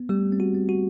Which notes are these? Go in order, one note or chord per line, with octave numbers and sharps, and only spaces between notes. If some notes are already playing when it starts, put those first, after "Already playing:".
Already playing: B3
G3 A3 G4
C4
F#4
C4
F#4